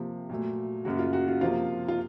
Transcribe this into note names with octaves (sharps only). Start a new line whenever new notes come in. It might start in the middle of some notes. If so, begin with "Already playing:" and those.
Already playing: C3 F3 A#3
A#2 F#3 A3
F#2 C#3 F#3 A#3 F#4
F4
F#4
F4
C3 F3 A#3 F4
F4